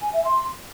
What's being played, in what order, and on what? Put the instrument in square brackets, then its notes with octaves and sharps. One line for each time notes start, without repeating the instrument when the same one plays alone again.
[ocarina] G#5
E5
C6